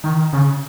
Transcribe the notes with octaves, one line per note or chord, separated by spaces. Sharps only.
D#3
C#3